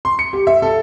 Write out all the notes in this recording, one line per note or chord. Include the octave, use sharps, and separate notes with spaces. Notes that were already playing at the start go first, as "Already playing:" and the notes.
C6
C#7
G4
E5
A4